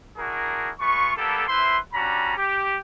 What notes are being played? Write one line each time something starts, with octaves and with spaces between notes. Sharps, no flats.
D4 E4 F#4 G#4 A#4
G#3 F4 B4 C#6
G3 A#3 B3 G4 A4
E4 B4 C5 E5 C6
G3 C#4 D4 F#4 A#5 B5
G4